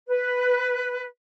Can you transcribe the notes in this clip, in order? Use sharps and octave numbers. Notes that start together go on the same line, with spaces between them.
B4